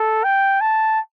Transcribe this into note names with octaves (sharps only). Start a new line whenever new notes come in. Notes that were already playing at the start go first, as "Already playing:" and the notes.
Already playing: A4
G5
A5